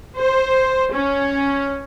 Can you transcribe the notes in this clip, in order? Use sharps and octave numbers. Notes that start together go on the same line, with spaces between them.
C5
C#4